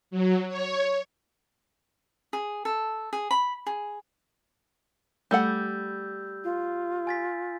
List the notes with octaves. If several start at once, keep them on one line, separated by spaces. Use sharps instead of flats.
F#3
C#5
G#4
A4
G#4
B5
G#4
G3 A3 A4 F#5 E6 G6
F4
G#5 A6 B6